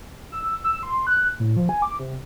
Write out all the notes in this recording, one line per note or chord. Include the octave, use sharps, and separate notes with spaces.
E6
E6
C6
F#6
A2
F3
G#5
D6
C3